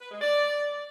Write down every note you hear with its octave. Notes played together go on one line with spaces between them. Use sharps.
B4
G#3
D5